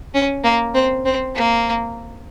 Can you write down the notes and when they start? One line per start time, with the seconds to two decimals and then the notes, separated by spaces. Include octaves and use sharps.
0.14 C#4
0.44 A#3
0.74 C4
1.05 C4
1.35 A#3